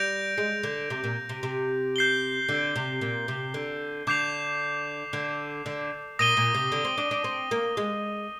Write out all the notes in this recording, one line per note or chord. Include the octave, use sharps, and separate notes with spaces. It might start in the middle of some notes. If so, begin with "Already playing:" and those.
Already playing: G3 G6 A#6 D7 F7
G#3
D3
C3
A#2
C3
C3
G6 C7 G7
D3
C3
A#2
C3
D3
D3 D6 G6 C7 F7
D3
D3
A#2 D#6 A#6 D#7 G7
A#2
C3
D3
C4
D4
D4
C4
A#3
G#3